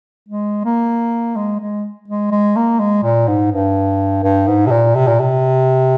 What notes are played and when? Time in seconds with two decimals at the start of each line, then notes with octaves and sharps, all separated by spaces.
0.28 G#3
0.64 A#3
1.36 G#3
1.60 G#3
2.08 G#3
2.31 G#3
2.56 A#3
2.80 G#3
3.03 A#2
3.28 G#2
3.52 G2
4.24 G2
4.47 G#2
4.67 C3
4.71 A#2
4.95 C3
5.07 A#2
5.20 C3